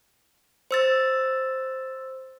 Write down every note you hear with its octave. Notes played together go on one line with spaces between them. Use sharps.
C5 E6 A6